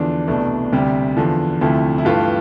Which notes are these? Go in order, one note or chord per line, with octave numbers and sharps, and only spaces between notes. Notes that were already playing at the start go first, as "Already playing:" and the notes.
Already playing: E2 D3 F3 D4
C2 B2 A3
D2 C3 G3
E2 D3 F3
D2 C3 F3 A3 E4
E4
G2 E3 A3 F4